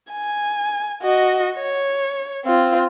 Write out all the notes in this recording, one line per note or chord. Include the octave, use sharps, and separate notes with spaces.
G#5
F#4 D#5
C#5
C4 F4